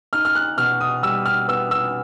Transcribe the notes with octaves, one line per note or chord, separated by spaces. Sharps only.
D#4 F6
F6
F#6
B2 F6
D#6
G3 E6
F6
B3 E6
E6